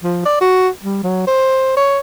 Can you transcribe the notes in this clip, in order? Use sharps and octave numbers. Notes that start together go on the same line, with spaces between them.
F3
D5
F#4
G3
F#3
C5
C#5